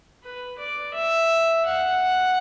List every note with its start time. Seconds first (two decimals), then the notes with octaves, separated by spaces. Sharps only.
0.23 B4
0.58 D5
0.94 E5
1.65 F#5